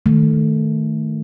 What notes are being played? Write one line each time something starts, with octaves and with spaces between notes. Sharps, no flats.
D#3 A3